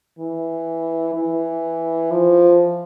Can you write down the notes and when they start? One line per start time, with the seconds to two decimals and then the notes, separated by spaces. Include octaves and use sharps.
0.19 E3
1.15 E3
2.11 F3